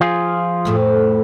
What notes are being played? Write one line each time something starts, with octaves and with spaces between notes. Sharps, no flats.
F3 F4 G#4
F2 A2 A3